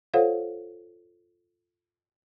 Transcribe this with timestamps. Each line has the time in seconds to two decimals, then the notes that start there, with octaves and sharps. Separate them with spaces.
0.14 F4 A4 C5 C#5 F5 F#5